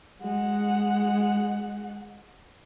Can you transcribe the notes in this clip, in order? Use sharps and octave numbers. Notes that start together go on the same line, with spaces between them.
G#3 F#5